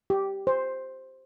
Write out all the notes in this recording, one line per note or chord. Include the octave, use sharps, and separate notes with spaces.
G4
C5